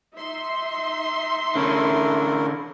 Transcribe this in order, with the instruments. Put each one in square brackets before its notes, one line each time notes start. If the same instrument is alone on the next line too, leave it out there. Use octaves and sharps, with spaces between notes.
[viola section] D#4 E5 C6
[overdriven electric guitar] D3 C#4 [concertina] A3 E4 A#4